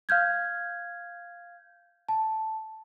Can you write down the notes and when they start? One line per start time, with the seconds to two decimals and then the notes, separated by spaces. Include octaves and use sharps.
0.09 F5 F6 G6 G#6
2.09 A5